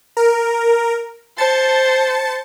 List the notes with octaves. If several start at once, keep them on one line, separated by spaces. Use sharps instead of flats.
A#4
C5 A5 A6 C#7